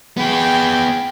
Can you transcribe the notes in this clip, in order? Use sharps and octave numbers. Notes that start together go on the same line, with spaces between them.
B3 G#4 G5 B5